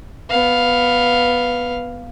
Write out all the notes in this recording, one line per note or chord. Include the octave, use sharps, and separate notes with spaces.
B3 F5